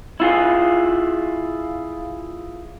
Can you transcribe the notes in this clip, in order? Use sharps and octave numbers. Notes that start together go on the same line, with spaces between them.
E4 F4 G#4